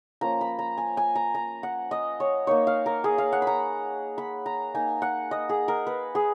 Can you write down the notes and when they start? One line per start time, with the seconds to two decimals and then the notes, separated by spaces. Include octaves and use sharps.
0.21 F3 A#3 C#4 A#5
0.41 B5
0.59 A#5
0.77 G#5
0.97 G#5
1.15 A#5
1.34 A#5
1.63 F#5
1.91 D#5
2.20 C#5
2.47 A#3 D#4 C#5
2.67 F5
2.86 A#4
3.04 G#4
3.18 F5
3.32 F#5
3.42 B5
3.47 A#5
4.18 B5
4.46 A#5
4.74 A#3 D#4 G#5
5.02 F#5
5.31 D#5
5.49 G#4
5.68 A#4
5.87 B4
6.15 G#4